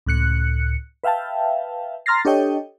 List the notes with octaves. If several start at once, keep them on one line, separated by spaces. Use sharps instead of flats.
C#2 A2 F#6 C#7
B4 E5 F5 G5 A5
A#5 C6 F6 A6 A#6 C7
D4 G4 A4 C#5 D#5 G5